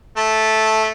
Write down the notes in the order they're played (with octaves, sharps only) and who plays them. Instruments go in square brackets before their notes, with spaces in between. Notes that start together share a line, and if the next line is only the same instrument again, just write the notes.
[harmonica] A3 A5